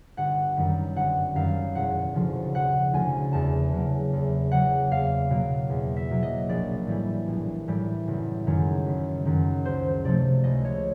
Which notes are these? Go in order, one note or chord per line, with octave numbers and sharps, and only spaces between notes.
G1 F#5
F#2 D#3 G3
G1 F#5
F#2 D#3 G3 F5
E1 F#5
D2 C#3 F3
E1 F#5
D2 C#3 F3 G#5
E2 A5
C#3 F#3 A#3
E2
C#3 F#3 A#3 F#5
E2 F5
B2 F#3 A#3
E2
E5
B2 F#3 A#3
D#5
A#1 D5
A2 E3 G3
A#1
A2 E3 G3
F#1
F#2 D#3 G#3 C#4
F#1
F#2 D#3 G#3 C#4
C#2 C5
C3 F3 A3 D5
C#2 D#5
C#5